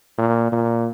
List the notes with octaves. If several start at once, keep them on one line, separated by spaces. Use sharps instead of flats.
A#2
A#2